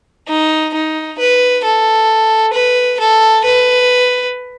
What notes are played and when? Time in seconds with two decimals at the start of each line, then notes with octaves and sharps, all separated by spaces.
0.28 D#4
0.74 D#4
1.18 B4
1.64 A4
2.53 B4
2.99 A4
3.44 B4